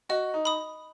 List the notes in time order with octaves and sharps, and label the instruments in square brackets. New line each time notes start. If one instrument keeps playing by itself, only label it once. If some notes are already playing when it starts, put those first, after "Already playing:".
[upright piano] F#4 [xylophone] D#5
[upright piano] D#4
[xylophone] B5 D#6